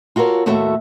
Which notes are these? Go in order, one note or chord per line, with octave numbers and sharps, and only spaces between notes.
F4 F#4 A4 A#4 C#5
D#2 A2 A3 F#4 A4 E5